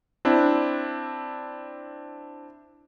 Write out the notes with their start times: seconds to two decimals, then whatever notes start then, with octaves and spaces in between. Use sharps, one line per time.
0.25 C4 D4 E4